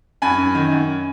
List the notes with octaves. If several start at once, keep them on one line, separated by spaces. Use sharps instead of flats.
F#2 G#5 B5
F#2
D#3
F#2